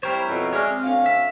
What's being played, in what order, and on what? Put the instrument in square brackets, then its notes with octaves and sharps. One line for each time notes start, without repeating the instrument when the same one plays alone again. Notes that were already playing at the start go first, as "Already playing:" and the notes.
[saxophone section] G3 C4 C5 [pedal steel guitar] E4 A#4 C#5
[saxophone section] F2 B2 C#4
[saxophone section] G#3 D5 E5 [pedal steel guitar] C#5 F6
[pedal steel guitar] C4
[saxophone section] D2 C#4 F5
[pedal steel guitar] E5